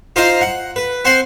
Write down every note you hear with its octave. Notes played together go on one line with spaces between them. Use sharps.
D#4 F4 C5 D#5 F5
F#5
B4
C4 C5 F#5 C6